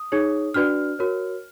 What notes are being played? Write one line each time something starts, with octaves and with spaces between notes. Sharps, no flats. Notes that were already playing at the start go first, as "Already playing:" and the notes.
Already playing: D#6
D#4 G#4 C#5
D4 F#4 B4 D5 F6
F#4 A#4 C#5